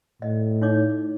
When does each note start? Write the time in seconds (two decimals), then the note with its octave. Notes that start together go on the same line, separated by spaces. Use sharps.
0.22 A2 D#5
0.62 D#4 C#5 D6